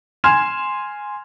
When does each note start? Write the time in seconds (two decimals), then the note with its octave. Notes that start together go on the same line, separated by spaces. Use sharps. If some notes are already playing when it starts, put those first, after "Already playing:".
0.24 G#5 C6 F6 G#6 E7